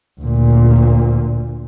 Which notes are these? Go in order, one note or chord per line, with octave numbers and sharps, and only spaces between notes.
D2 A#2